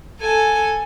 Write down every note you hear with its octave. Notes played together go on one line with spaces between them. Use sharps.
A4 G#5